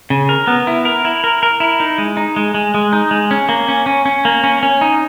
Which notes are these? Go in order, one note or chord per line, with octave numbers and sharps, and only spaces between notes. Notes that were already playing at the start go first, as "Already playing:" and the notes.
C#3
A#4
B3
E4
A#4
E4
A#4
A#4
E4
D#4
G#3
D#4
G#3
G#3
G#3
D#4
G#3
C#4
A#3
C#4
C#4
C#4
A#3
C#4
C#4
D#4